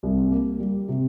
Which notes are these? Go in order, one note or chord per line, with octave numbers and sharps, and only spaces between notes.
C2
A#3
G3
C3